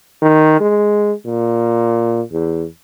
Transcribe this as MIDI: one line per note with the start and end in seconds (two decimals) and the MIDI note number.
0.22 0.59 51
0.60 1.12 56
1.26 2.21 46
2.32 2.65 40